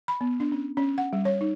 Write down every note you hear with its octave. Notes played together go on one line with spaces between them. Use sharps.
B5
B3
D4
C#4
C#4
F#5
G3
C#5
D#4